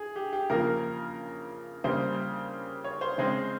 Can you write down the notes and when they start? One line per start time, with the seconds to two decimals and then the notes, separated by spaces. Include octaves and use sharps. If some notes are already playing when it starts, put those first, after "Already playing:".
Already playing: G#4
0.16 G4
0.33 G4
0.50 C#3 F3 A#3 A#4
1.84 C#3 G3 A#3 C5
2.84 C#5
3.01 C5
3.18 C#3 G#3 C4 C5